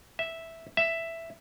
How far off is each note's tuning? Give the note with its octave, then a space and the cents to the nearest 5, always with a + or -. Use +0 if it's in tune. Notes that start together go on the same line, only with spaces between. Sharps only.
E5 -5
E5 +5